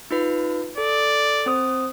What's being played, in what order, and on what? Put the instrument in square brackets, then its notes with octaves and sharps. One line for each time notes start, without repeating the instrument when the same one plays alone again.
[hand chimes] D#4 F4 B4
[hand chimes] A4 [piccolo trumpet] D5
[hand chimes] C4 C5 D#6